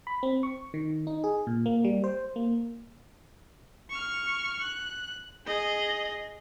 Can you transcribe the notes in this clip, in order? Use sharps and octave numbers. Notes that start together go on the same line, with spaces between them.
B5
C4
C#6
D#3
D#4
G#4
A#2
A#3
G3
C5
A#3
C#6 F6
F#6
G#4 D#5